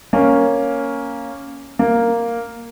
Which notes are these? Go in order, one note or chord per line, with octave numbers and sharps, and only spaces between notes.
A#3 C#4
A#3